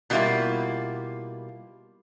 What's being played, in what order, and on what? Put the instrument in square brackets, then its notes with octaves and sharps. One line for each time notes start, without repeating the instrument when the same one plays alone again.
[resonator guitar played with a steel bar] B2 F#3 G3 A#3 E4 F4